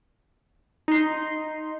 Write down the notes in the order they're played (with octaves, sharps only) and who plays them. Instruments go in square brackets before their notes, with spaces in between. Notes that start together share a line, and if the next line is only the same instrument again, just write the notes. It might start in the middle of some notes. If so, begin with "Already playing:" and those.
[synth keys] D#4 C6